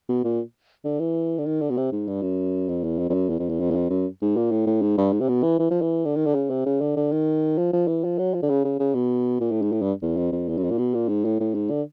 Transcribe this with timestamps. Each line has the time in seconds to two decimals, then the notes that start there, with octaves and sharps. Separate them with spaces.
0.09 B2
0.24 A#2
0.84 D3
0.99 E3
1.38 D3
1.45 D#3
1.61 D3
1.70 B2
1.77 C3
1.92 G#2
2.07 G2
2.22 F#2
2.69 F2
2.83 E2
2.99 F2
3.09 F2
3.13 F#2
3.29 E2
3.39 F2
3.49 E2
3.60 F2
3.70 E2
3.75 F2
3.90 F#2
4.22 G#2
4.36 A#2
4.51 A2
4.66 A2
4.82 G#2
4.98 G2
5.12 G#2
5.20 C3
5.28 B2
5.43 E3
5.59 E3
5.70 F3
5.81 E3
6.05 D3
6.16 D#3
6.26 D3
6.34 C#3
6.50 C3
6.66 C#3
6.81 D3
6.96 D3
7.11 D#3
7.58 F3
7.73 F3
7.87 E3
8.04 F3
8.18 F#3
8.34 F3
8.42 D3
8.49 C#3
8.64 C#3
8.79 C#3
8.94 B2
9.40 A#2
9.51 A2
9.62 G#2
9.72 A2
9.82 G2
10.02 E2
10.17 F2
10.32 F2
10.48 E2
10.57 F#2
10.63 F2
10.71 A#2
10.78 B2
10.94 A#2
11.08 G#2
11.25 A2
11.40 A2
11.54 G#2
11.70 D3